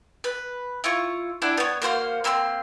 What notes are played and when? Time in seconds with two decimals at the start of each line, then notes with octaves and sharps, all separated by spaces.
0.24 B4
0.84 E4 F4 C#6
1.42 D4 E4 F#5 G5
1.57 B3 C#5
1.82 A#3 F#4 C5 F5
2.24 A#3 C4 B5 C6